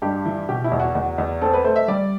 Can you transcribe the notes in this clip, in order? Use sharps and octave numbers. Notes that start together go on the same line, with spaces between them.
G2 G4
E3
B2 G4
E4
E2
F#4
E2 F#4
E2
C4 A4
B4
A3 C5
E5
G3 D5